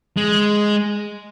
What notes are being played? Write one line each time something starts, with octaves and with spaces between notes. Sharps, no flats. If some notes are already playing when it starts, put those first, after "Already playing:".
G#3